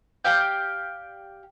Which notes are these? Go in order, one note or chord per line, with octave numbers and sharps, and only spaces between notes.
G4 D5 F5 G5